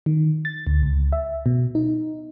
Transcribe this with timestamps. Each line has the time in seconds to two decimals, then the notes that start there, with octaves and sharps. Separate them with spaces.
0.06 D#3
0.45 A6
0.67 D2
0.82 C#2
1.13 E5
1.46 B2
1.75 D#4